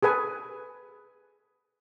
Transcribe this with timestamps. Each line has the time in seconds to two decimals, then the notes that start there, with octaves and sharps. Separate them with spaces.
0.03 G#4 A4 B4 G#5